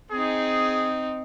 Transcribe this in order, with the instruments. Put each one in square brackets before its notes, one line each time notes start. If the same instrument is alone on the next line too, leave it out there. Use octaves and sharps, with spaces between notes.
[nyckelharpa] C4 D#4 [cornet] G#4